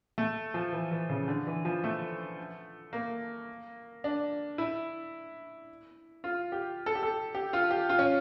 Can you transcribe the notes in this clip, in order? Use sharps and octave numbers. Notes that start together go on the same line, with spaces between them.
A3
F3
E3
E3
C#3
D3
E3
F3
A3
A#3
D4
E4
F4
G4
A4
G4
A4
G4
F4
G4
F4
C#4